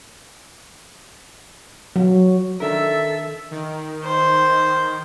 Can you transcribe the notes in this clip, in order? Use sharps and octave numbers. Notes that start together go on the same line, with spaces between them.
F#3
D#3 D4 A4 A#4 E5
D#3
C5